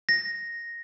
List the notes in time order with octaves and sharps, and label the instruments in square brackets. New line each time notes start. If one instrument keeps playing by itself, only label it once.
[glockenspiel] A#6